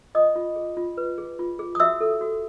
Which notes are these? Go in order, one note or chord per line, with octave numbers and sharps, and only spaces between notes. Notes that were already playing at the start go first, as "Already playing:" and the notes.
F4 D#5 D#6
F4
G#4
F4
B4
G#4
F4
G#4
D#6
F#4 E5 E6
A4
F#4